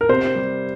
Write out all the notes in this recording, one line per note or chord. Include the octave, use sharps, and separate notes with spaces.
A#4
C3 C5
G3